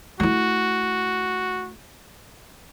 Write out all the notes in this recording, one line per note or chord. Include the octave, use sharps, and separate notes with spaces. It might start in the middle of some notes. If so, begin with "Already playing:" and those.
A3 E4 F#4